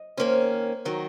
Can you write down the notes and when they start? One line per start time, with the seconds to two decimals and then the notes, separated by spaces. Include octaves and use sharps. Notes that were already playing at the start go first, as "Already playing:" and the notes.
Already playing: D#5
0.17 D#3 A#3 C#4 C5
0.85 D#3 F#3 C#5